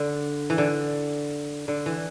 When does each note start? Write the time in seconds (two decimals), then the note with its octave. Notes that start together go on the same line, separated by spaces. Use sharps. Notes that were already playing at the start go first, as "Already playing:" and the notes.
Already playing: D3
0.50 E3
0.58 D3
1.68 D3
1.86 E3